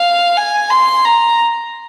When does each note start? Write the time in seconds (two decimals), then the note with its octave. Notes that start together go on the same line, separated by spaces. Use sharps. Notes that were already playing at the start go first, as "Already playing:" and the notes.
Already playing: F5
0.37 G#5
0.70 C6
1.05 A#5